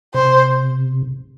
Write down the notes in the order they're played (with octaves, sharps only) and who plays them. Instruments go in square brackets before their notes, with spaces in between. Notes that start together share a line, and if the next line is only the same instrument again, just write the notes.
[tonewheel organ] C3 [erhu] C5